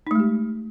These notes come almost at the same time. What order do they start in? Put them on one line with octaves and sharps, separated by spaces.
D#4 A3 G#3 G4